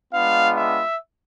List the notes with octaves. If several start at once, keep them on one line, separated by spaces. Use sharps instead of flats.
G#3 B3 D4 F4 F5
E5